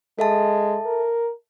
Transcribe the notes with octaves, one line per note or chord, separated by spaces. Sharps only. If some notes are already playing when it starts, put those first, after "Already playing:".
G#3 A4 E5 A5
A#4